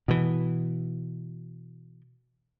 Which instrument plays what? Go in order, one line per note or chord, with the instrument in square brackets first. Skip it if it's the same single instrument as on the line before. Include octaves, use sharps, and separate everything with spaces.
[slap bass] B2 E3